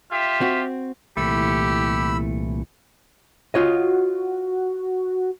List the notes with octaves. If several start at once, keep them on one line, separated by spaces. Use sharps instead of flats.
F4 G4 E5
C4 F#4
C2 A#2 E3 A3 G4 B5 E6
F4 F#4 C#5 D#5